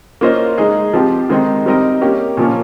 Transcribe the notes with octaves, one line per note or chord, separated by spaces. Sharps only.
A#3 C#4 F4 C5 D#5
G#3 D#4 G#4
F3 C4 G4
D#3 G#3 C4 D#4
G3 C4 D#4 A#4 D#5
A#3 C#4 G4
A#2 F3 A#3 C#4